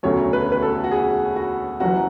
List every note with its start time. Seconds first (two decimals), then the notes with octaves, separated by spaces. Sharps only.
0.03 E1 D2 C#3 F#3 A3 C#5
0.33 B4
0.52 B4
0.62 A4
0.84 F#4
0.91 G#4
1.36 F#4
1.80 F#1 F#2 E3 F#4